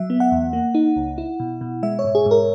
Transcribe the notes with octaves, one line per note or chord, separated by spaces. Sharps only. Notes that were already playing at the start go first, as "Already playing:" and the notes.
Already playing: F#3 E5
B3
F#5
E2
A#3
D#4
C#2
E4
B2
B2
G#3 E5
C#5
G#2
G#4
G#2
A#4